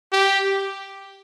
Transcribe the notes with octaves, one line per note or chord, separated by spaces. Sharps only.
G4